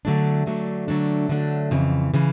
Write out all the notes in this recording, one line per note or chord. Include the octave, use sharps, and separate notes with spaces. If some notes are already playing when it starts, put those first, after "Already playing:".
D3 F#3 A3 D4
D3 F#3 A3 D4
D3 F#3 A3 D4
D3 F#3 A3 D4
F2 C#3 E3
C#3 E3